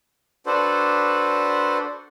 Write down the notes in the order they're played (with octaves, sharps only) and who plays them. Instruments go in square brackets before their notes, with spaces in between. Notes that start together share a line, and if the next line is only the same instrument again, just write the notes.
[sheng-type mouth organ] D4 F#4 A4 B4 C5